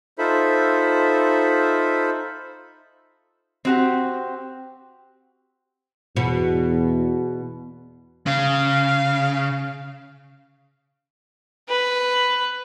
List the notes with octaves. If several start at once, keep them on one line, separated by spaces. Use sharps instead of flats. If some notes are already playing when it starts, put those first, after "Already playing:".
D#4 F4 A4 C5 E5 B5
C4 F#4 G4
E2 B2
C#3 F5
B4